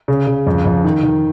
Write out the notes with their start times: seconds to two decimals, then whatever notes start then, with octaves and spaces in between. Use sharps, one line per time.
0.08 C#3
0.27 C#3
0.47 F2
0.66 F2
0.84 D#3
1.03 D#3